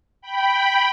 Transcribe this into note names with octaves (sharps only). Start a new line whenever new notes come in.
G5 B5